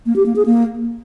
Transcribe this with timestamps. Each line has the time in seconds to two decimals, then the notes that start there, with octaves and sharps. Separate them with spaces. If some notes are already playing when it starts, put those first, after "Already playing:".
0.06 A#3
0.16 G4
0.26 A#3
0.36 G#4
0.46 A#3